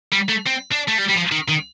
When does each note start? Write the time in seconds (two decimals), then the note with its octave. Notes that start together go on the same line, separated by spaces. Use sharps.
0.13 G3
0.29 A3
0.47 C4
0.72 D4
0.88 A3
0.98 G3
1.09 G3
1.15 F3
1.32 D#3
1.49 D#3